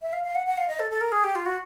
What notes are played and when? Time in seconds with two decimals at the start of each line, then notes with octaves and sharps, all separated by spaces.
0.02 E5
0.13 F5
0.24 F5
0.35 F#5
0.46 F#5
0.57 F5
0.68 D#5
0.79 A4
0.91 A4
1.01 A#4
1.12 G#4
1.24 G4
1.35 F4
1.46 F#4